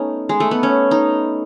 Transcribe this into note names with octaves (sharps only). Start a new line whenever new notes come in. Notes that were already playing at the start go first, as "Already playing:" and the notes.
Already playing: A3 B3 C#4 D#4
G#3
A3
B3
C#4
D#4